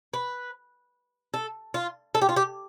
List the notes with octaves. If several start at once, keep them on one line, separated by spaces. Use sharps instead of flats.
B4
A4
F4
A4
G4
F4
G4